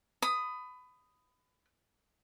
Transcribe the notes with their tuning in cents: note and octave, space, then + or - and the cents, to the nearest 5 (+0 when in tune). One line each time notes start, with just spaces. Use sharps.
B5 +25 D#6 +0